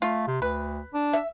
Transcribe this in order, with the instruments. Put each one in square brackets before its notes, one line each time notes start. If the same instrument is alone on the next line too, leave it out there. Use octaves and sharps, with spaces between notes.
[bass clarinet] A3 [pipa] F4
[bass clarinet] C3
[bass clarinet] D2 [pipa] B4
[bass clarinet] D4
[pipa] E5